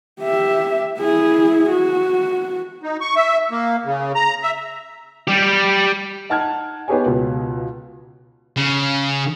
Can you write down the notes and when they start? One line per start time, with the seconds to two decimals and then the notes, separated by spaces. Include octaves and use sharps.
0.21 G4 E5
1.00 E4 G#4
1.69 F#4
2.83 D#4
3.01 C#6
3.16 E5
3.51 A#3
3.85 C#3
4.15 A#5
4.43 E5
5.27 G3 G4
6.30 D#4 F#5 A5 F6 G#6
6.88 B3 D#4 G4 G#4 C#5 G#5
7.06 C#2 B2
8.57 C#3